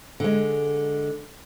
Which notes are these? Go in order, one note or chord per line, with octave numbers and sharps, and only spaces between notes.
D3 G#3